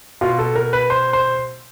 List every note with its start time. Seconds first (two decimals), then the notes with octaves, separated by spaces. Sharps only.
0.21 B2 F4
0.39 A4
0.56 A#4
0.73 B4
0.90 C5
1.13 C5